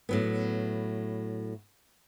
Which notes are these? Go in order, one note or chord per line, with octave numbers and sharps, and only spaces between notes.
A2 F#3 B3